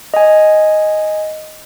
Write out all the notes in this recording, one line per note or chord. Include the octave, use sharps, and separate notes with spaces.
D#5 G#5